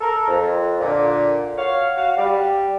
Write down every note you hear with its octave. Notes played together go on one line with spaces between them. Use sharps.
A4 A#4
F2
A#2 D3
F#4 C#5 F5
F#4 F5
G3